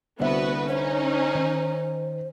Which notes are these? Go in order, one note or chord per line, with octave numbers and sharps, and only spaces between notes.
C2 D3 B3 F#4 B4 C5 E5
C#4 D#4 C5
D#3